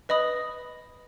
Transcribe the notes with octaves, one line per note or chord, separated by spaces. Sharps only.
B4 D#5 B5 D#6